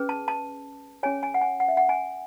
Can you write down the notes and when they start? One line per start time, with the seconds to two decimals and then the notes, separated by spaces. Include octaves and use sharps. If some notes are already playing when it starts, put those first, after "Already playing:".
Already playing: C#4 G#4 B4
0.09 A5
0.28 A5
1.03 C#4 G#4 C#5 G#5
1.23 G#5
1.34 F#5
1.41 G#5
1.60 F#5
1.68 E5
1.77 F#5
1.89 G#5